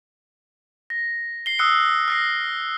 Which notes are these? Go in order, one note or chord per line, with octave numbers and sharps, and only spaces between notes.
A#6
C7 G7
D#6 E6 F#6 C#7
F6 A#6 C7